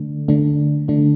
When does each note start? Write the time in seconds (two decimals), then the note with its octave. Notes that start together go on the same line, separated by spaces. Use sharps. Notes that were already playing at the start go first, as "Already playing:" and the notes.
Already playing: D3 A3 D4
0.28 D3 A3 D4
0.88 D3 A3 D4